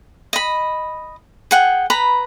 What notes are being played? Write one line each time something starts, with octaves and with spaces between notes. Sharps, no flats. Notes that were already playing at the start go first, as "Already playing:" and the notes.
D#5 B5
G#4 F#5 G5
B4 A#5 B5